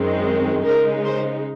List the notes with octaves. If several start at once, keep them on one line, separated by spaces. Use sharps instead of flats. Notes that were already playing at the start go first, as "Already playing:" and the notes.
Already playing: F#2 D#3 G#3 C4
C#3 G#3 D#4 A#4
C5